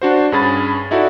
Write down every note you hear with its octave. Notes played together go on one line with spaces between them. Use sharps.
D4 F#4 C5
G2 C#4 G#4 B5 A6
D#4 E4 F#4 A4 D5